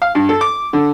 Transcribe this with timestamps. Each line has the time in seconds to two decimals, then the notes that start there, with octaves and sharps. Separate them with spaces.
0.02 F5
0.15 G2
0.29 A4
0.41 D6
0.73 D3